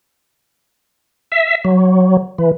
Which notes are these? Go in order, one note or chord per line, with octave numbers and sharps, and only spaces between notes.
E5
F#3
E3